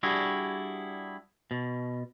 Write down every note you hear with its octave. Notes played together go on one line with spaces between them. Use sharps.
G3 D4 E4 F#4 G#4
B2